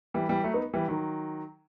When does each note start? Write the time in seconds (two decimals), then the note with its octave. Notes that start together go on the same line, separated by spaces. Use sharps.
0.14 E3 G3
0.29 E3 G3
0.44 F#3 A3
0.54 B3 D#4
0.74 E3 G3
0.88 D#3 F#3